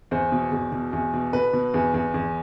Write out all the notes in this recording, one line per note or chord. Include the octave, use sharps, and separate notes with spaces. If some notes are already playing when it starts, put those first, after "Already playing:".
E2 C5
B2
E2
B2
E2
B2
B2 B4
B2
E2
E2
E2